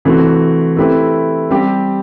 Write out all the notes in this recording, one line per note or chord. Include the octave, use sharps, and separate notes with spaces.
C3 E3 A3 C4 F#4
A3 C4 E4 G4 B4
G3 C4 G4